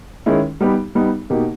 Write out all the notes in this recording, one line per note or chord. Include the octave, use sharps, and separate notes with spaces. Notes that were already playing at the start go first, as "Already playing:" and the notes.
D#3 G#3 C#4 E4
G3 B3 D#4 G4
G3 B3 D#4 G4
B2 A#3 D#4 G4